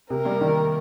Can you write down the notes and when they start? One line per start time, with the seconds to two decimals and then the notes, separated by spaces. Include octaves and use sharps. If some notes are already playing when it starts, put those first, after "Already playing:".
0.10 C3 A#4
0.25 G3 A#3
0.41 D#3 G3